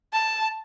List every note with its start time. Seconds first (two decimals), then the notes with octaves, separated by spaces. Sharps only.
0.13 A5